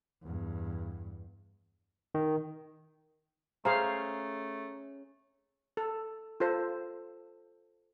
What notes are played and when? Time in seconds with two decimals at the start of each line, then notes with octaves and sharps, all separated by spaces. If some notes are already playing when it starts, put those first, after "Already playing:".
0.23 E2 G2
2.15 D#3
3.65 A3 C#4 G#4 C5 F5 A#5
5.77 A4
6.40 F4 A4 C5